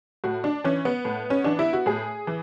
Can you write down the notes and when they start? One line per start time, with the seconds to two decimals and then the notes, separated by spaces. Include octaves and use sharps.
0.24 A2 F#4
0.44 D4
0.64 E3 C#4
0.85 B3
1.05 A2
1.30 C#4
1.44 E3 D4
1.59 E4
1.73 F#4
1.86 A2 G#4
2.27 E3